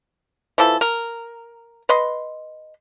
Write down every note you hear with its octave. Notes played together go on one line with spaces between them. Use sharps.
E3 F3 A4
A#4
B4 D#5 C6